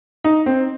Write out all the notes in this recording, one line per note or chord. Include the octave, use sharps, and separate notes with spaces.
D#4
C4